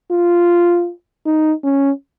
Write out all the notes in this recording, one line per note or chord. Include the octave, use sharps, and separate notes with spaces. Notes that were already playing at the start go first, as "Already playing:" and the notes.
F4
D#4
C#4